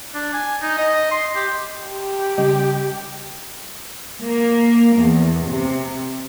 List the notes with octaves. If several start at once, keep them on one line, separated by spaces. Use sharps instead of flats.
D4
G#5
D#4
D#5
C6
G4
G4
C#3 G3 D#5
A#3
E2
C3